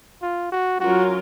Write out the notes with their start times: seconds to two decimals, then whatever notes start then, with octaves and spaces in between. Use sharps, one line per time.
0.22 F4
0.52 F#4
0.80 F#3 C#4 F4 F#4 A#4